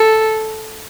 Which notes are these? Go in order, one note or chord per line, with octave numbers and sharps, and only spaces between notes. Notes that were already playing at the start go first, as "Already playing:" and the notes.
Already playing: A4